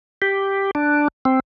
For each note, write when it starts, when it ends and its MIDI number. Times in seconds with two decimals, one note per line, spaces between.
0.22 0.71 67
0.75 1.08 62
1.25 1.40 60